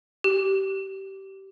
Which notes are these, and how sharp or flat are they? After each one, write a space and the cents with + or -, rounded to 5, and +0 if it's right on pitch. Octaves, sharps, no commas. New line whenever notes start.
G4 -20